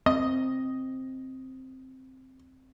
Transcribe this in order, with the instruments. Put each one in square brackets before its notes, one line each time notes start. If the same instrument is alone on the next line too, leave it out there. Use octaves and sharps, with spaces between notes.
[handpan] C4 [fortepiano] D#5